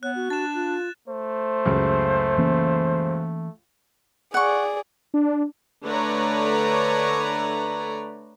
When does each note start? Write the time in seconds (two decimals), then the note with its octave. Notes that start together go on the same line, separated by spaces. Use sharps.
0.03 B3 C#5 F#6
0.15 F#4
0.30 D4 A6 E7
0.55 F4
1.08 A3 C5
1.65 C#2 F#2 C#3
2.38 E3 A#3 C#4
4.34 G#4 D5 F#5 C#6
5.14 D4
5.85 D3 A3 B4 C#5 D5 A#5